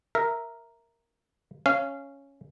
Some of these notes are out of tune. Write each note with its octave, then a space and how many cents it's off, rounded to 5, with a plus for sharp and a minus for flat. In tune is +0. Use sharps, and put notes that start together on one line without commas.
A#4 +0 E5 +0
C#4 +0 F5 -20